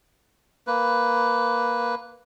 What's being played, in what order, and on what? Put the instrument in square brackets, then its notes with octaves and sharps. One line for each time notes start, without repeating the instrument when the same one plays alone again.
[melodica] A#3 B4